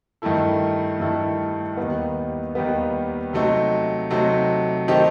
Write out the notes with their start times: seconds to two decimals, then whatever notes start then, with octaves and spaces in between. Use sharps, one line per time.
0.22 G2 D#3 A3 E4 A4
1.00 G2 D#3 A3 E4 A4
1.77 D#2 D#3 G3 B3
2.55 D#2 D#3 G3 B3
3.33 C3 F#3 A3 D#4
4.10 C3 F#3 A3 D#4
4.88 D#3 A3 C4 D#4 G4